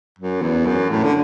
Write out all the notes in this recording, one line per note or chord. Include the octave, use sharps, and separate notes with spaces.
F#2
E2
F#2
A2
D3